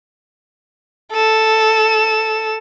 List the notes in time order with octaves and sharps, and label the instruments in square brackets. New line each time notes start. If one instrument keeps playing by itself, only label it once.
[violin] A4 E7